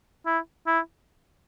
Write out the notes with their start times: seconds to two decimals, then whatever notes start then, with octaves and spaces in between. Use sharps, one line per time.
0.26 E4
0.67 E4